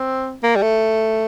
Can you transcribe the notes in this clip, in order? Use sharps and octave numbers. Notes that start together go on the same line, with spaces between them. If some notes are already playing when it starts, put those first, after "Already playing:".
Already playing: C4
A#3
G3
A3